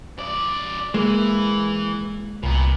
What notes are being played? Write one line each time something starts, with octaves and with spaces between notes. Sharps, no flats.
F#2 D5
E3 G#3 A#3
C2 A#2 B3